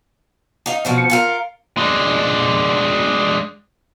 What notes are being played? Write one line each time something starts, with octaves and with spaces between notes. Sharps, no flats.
D#4 F5
B2 F3 C4
C#7
F4 G#4 A#4
G#3 D4